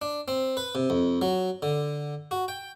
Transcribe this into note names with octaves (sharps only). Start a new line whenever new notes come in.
D4
C4
B4
C3
F2
F#3
D3
F#4
G5